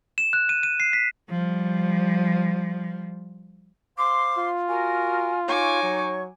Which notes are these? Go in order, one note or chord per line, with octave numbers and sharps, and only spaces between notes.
E7
F#6
D#7
D#7
C7
B6
F3 G3
C5 F5 C6 D6
F4
F#4 A#4 G#5
D#4 C#5 G#5 C#6 D6
F#3